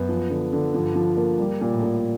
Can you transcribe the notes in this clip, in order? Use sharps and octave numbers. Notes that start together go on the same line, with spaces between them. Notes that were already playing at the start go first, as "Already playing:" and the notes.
Already playing: F#2 B3
F3
D3
D3
G2 F3
F3
A#3
G3
A#2
A2
A#2